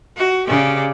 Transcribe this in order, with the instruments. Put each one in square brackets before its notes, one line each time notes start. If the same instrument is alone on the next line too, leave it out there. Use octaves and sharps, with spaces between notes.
[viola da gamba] F#4
C#3 G4 D5